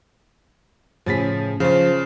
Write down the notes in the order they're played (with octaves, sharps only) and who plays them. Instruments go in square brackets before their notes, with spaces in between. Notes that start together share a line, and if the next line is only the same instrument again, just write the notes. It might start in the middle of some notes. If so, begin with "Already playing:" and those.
[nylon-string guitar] A2 C#3 G#4 [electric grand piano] F3 A6 B6
[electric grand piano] C#3 F4 [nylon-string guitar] F3